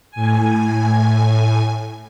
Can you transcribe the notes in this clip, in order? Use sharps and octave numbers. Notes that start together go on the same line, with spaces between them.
A2 G#5